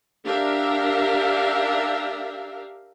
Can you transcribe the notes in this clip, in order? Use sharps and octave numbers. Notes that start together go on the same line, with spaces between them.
D4 G4 A#4 E5 F5